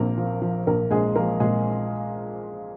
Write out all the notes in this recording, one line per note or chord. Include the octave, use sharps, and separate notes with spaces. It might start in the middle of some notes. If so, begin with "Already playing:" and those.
Already playing: A#1 A#2 F3 A#3 C4 A#4
F3
F3
A#1 A#3 A#4
A#1 G#3 G#4
F3 A#3 A#4
A#2 G#3 G#4